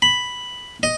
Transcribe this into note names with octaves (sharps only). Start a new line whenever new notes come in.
B5
D#5